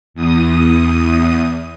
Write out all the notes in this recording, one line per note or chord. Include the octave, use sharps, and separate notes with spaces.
E2 D#6